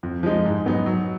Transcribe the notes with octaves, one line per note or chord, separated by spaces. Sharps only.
F2
F3 G#3 D#4
G#2
F#3 B3 D#4
F#3